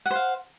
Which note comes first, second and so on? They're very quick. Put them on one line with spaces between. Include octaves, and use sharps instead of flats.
F#5 C5 F5